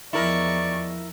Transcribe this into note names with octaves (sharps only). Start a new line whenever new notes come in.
E2 F3 G#3 E4 A#4 D5 C#6